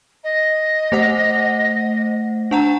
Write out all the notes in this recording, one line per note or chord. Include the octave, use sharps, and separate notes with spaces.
D#5
A3 C5 F#5
D4 F#5 A5 A#5